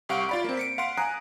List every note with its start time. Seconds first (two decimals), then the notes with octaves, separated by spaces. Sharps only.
0.09 C2 G4 F5 F#5 C#6 D7
0.29 F4 D5 B5
0.44 A#3 C4
0.57 B6 C#7 D7
0.78 F5 F#5 C6 D7
0.98 G#5 A#5 D#6 F#6